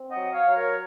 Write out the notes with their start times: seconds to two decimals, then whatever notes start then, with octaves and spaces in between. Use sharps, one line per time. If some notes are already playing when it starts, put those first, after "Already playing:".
Already playing: C4
0.09 D#5 F#5
0.17 F#3
0.31 C#5 F5
0.46 F#3
0.53 A#4 C#5